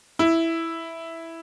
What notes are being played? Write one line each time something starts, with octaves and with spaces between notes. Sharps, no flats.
E4